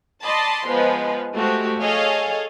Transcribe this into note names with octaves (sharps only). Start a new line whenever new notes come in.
D5 D#5 A5 B5 C6
F3 G#3 B3 B4
G#3 A3 F#4 G4 C5
G#4 A4 C#5 D#5 F5 G#5